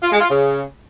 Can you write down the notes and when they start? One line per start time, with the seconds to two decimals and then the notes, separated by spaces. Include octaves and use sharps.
0.02 F4
0.11 G#3
0.20 F4
0.29 C#3